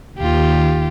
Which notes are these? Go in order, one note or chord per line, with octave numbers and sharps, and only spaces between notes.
D#2 F4 G4